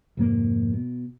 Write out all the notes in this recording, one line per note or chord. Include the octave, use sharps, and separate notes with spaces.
F1 G#2 A#3
B2